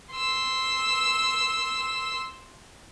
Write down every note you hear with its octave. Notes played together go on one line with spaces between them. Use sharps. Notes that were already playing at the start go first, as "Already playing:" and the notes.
C6 E6